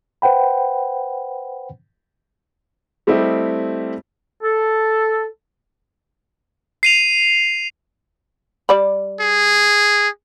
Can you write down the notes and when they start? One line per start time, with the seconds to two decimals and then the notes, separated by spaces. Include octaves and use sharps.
0.22 B4 C5 F#5 G5 B5
3.07 G3 A3 C4 E4 G4 D#5
4.43 A4
6.83 C7 D#7 F7
8.69 G3 D5 B5
9.21 G#4